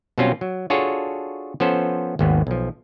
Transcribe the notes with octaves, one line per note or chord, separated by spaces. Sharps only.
B2 F#3 G3 C4 C#4 F4
F#3
D4 F4 F#4 G#4 A4 C#5
F3 B3 C#4 A4 C5
G#1 D#2 B3
B1 F3